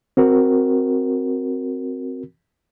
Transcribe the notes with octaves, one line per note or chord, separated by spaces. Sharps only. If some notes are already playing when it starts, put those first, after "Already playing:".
C4 F#4 A#4